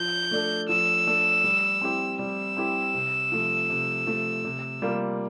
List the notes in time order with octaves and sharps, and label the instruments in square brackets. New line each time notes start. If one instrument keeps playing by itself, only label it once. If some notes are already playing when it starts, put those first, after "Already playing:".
Already playing: [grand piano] F3 [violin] G6
[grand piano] A3 D4 A4
[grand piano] F3 [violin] E6
[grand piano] A3 D4 A4
G3
C4 E4 G4
[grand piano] G3 [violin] E6
[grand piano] C4 E4 G4
C3
F3 A3
C3
F3 A3
C3
G3 A#3 F4